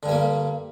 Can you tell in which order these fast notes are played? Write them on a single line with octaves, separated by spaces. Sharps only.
D3 G2 G3 A#3